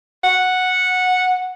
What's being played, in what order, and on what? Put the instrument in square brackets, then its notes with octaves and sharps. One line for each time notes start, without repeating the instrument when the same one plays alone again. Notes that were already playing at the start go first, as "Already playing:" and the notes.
[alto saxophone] F#5